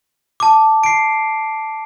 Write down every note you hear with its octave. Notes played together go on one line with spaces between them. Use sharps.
A5 D6
C7 D7